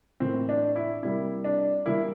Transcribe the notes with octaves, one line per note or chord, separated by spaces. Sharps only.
A2 E3 A#3 C4
D4
E4
C3 G3 A#3 E4
D4
E3 G3 A#3 E4